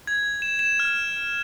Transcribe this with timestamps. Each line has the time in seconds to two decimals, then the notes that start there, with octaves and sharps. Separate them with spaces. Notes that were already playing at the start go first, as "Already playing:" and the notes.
0.07 G#6
0.42 E7
0.59 E7
0.80 F6